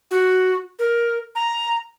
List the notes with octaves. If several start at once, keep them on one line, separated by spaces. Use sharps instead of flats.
F#4
A#4
A#5